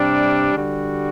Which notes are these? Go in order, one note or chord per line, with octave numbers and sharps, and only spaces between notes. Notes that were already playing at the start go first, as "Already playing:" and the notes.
Already playing: C3 G3 D4
D3 G3 D4 F#4